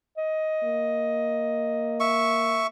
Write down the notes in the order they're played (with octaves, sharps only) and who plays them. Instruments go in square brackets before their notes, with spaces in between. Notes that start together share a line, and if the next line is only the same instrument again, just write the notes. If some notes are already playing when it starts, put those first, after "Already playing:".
[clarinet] D#5
[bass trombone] A#3
[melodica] E5 C#6